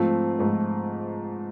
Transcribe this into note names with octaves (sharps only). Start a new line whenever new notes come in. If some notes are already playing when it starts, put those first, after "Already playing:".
Already playing: G#2 F3 A3 C4 F4
G#2 F3 A3 C4 F4